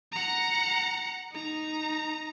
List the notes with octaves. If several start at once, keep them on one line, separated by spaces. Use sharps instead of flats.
F#5 A#5
D#4 A#5